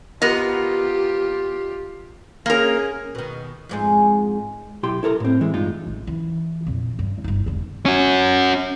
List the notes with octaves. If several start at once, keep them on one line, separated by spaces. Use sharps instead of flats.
B3 F4 G4 A#4 D#5
A#3 C#4 G#4 A#4
B2 D#3
F2 G#2 G#3
B1 E4 G4 G5 C6
E4 A4 A#4 A#5
A2 C4
E3 G#3
G2 G#3 D#4 F4
A1
E3
F2 A#2
G2
G1 D#4
E1 D3
C#4 F#4